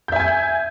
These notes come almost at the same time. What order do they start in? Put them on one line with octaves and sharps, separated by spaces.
G6 E5 G#5 G#6